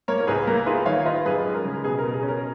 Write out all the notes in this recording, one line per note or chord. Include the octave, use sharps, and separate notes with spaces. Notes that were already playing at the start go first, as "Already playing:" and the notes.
A#3 A#4 C#5
A#4
C#2 G#4 B4
A#3 A#4
F4 G#4 B4
D#3 C#5 F5
F4 B4 D#5
F#2 G#4 B4
G#3
A#4
C#3
B2 G#4
B2 A#4
G#4
C#4
A#4